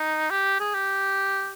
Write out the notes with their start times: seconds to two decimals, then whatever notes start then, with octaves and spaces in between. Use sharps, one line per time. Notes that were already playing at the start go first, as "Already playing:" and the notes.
Already playing: D#4
0.31 G4
0.60 G#4
0.74 G4